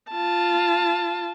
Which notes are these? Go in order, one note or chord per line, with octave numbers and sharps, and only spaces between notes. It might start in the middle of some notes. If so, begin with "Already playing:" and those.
F4 A5